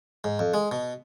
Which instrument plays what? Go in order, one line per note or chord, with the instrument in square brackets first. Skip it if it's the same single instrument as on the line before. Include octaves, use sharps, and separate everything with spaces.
[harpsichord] G#2
F2
G#3
B2